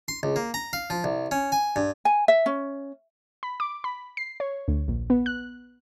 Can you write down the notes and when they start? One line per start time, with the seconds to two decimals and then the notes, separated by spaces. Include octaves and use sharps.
0.08 C6
0.23 C#2
0.36 A#3
0.54 A#5
0.73 F5
0.90 F3
1.04 C2
1.31 C#4
1.52 G#5
1.76 G2
2.05 G#5
2.28 E5
2.46 C#4
3.43 B5
3.60 D6
3.84 B5
4.17 C7
4.40 C#5
4.68 D2
4.88 A#1
5.10 B3
5.26 F#6